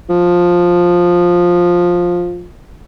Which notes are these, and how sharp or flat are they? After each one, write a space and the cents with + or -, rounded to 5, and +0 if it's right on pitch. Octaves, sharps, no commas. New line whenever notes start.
F3 +10